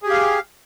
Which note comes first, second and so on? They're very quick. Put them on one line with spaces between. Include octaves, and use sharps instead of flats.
G#4 G4 F5